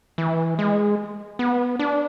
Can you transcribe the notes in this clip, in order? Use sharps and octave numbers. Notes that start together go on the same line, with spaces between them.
E3
G#3
B3
D4